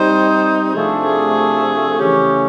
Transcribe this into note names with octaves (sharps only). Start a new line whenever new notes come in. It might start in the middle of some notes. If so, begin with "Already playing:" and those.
Already playing: G3 C4 D#4 C5
C3 F3 A3 D4 G#4
G#4
C#3 E3 A3 C#4 G4